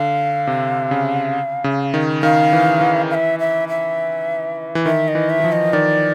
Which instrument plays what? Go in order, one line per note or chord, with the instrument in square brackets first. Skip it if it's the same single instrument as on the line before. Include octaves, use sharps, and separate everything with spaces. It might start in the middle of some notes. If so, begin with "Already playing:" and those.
Already playing: [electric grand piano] D3 [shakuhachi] F5
[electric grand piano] C3
C#3
C#3
D#3
[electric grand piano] D#3 [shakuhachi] F5
[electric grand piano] E3
E3
[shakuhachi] F5
E5
E5
E5
[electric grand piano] E3
[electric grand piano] D#3 [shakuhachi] E5
[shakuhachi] D#5
[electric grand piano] E3
[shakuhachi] E5
[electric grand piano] E3
F3
[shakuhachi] D#5
[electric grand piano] D#3 [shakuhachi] D5